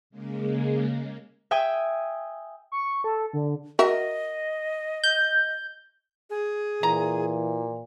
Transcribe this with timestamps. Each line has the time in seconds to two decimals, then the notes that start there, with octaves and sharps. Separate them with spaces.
0.10 C#3 G#3 A#3
1.51 E5 G5 G#5 D#6
2.72 C#6
3.04 A4
3.33 D3
3.79 F#4 A#4 D#5 E5
5.04 G6
6.30 G#4
6.83 A#2 E3 A#5